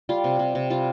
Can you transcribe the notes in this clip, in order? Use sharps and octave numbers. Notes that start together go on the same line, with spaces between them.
G3 F4
C3
C3
C3
G3 F4